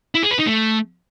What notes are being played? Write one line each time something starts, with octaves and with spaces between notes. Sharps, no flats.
E4
G#4
B4
D#4
A3